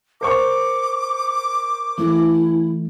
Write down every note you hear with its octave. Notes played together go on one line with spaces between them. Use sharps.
A#4 C5 C#6 D6
E3 A3 E4